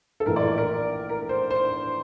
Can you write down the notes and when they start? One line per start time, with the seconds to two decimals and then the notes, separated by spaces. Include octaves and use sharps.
0.20 A4
0.26 A#1 A2 E3 A#4
0.36 D5
0.48 D5
0.58 A#4
1.09 A#4
1.29 C5
1.50 C5